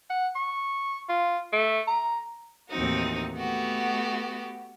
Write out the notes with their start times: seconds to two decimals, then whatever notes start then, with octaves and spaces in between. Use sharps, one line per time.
0.10 F#5
0.35 C#6
1.09 F4
1.52 A3
1.87 A#5
2.70 D#2 A2 E3 C4 D#4 F#4
3.36 A3 B3 F#4 G4